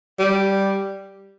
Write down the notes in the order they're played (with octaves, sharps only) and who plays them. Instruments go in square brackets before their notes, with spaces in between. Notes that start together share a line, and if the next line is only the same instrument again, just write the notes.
[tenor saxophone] G3